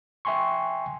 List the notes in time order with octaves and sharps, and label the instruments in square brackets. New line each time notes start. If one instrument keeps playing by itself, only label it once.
[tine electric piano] E5 G5 G#5 C6 C#6